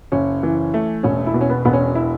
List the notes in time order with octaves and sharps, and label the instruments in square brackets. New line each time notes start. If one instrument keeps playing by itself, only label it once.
[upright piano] F#1 C#4
E3
A3
E1 C#4
E4
B2
C#4
B3
E1 B3
C#4
E4